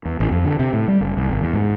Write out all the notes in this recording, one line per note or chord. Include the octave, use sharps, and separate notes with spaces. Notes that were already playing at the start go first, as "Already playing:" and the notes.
E2
A1
F2
D3
C3
A2
G3
F#1
C2
G#1
E2
G#2